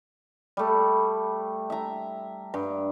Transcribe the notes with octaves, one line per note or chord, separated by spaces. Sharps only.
G3 A3
E5 A#5
G2